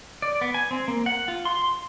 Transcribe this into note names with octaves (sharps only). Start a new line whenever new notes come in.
D5
B3
G#5
C4
A#3
F#5
F4
C6